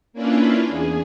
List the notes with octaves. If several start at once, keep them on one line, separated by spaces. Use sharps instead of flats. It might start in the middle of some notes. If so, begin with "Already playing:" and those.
A#3 C#4 D4 E4 F4 B4
E2 G#4